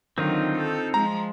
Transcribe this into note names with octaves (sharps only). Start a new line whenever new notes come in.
D3 D#3 F#3 C4 D#4 F4
A4
F3 G#3 A#5